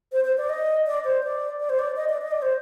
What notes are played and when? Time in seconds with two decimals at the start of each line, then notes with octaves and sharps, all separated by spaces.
0.12 C5
0.24 C5
0.37 D5
0.49 D#5
0.86 D5
1.04 C5
1.23 D5
1.60 D5
1.69 C5
1.79 D5
1.96 D#5
2.09 D5
2.21 D#5
2.31 D5
2.42 C5